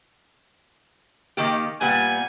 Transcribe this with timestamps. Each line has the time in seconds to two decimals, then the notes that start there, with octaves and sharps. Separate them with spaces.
1.37 D#3 A#3 G4
1.81 A#2 G3 B3 G#5